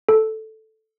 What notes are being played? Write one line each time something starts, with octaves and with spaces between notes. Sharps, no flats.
A4